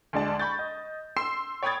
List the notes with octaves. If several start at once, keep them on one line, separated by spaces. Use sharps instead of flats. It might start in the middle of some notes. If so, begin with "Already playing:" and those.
D2 G#3 D5 A5
B5 C#6 G6 A6
D#5
C6 E6 C7 E7
C#5 G5 B5 D#6 G#6 A6